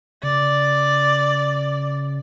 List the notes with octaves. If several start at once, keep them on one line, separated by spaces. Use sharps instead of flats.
C#3 D5